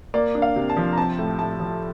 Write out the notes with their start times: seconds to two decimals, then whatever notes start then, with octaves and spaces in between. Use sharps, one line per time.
0.14 A#3 D5
0.35 D4
0.42 F5
0.56 C3
0.70 A5
0.77 F3
0.92 A#5
0.98 C4 A5
1.19 A2
1.39 A2 A5
1.60 F3